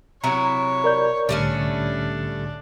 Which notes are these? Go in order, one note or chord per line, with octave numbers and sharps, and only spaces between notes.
C3 F#3 E4 C#5 A#5
A#4 D5 G6
C2 A2 D3 G3 A3 C#4 D4